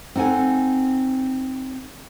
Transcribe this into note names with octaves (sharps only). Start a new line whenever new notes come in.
C4 D#4 A4 F#5 G#5